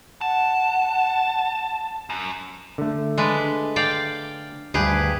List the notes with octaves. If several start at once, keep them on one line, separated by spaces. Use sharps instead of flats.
F#5 A5
F#2
D3 A3
G#3 D4 B4
D5 F5 G5
D2 G2 G4 G#4 B4